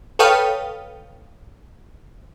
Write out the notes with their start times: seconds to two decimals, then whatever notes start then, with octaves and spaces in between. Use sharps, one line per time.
0.19 A4 B4 C#5 F5 G5 D#6